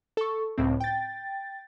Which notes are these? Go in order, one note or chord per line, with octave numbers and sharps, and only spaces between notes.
A4 C#6
C#2 A2 C4
G5 A6